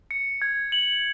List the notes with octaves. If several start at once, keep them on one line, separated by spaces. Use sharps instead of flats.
C#7
G#6
F#7